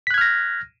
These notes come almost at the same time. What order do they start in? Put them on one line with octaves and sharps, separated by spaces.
B6 F#6 G#6 F6 A#6